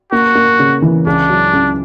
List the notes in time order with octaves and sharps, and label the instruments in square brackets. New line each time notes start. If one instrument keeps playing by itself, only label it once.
[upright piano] A#3 [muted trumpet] F#4
[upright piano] A#3
C#3
E3
[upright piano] C#2 [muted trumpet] D4
[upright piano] F#3
C#2